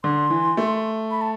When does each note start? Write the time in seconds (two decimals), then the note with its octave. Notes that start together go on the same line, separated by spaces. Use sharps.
0.04 D3 C6
0.30 E3
0.57 A3
1.11 B5
1.21 A5